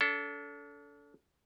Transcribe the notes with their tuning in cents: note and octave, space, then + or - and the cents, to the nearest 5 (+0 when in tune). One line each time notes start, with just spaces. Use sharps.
D4 -45 A4 +0